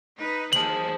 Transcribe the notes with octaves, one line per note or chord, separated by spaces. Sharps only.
D#4 B4
D#2 G#4 C5 A5 F#7